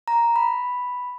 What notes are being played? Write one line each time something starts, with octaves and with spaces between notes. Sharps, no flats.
A#5
B5